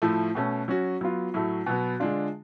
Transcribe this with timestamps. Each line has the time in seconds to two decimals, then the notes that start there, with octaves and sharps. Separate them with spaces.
0.02 A2 F3 A3
0.35 B2 A3 C#4
0.68 F#3 C#4 F#4
1.01 F#3 B3 F4
1.34 A2 F#3 A3
1.66 B2 F#3 B3
2.00 D3 G#3 D4 F4